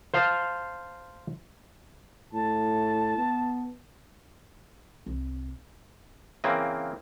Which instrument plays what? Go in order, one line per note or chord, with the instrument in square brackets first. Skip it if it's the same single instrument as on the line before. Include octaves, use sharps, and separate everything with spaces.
[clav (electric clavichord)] C5 F5 A5
[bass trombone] A2 [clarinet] A5
[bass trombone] B3
[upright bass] C2
[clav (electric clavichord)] C#3 E3 A#3 C4